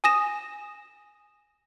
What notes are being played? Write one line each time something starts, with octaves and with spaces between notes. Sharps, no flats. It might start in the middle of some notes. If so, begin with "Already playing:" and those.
G#5 D#6 A#6 E7